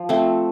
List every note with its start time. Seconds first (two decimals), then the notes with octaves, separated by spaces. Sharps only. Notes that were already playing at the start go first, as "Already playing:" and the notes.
Already playing: F3
0.09 A3 C4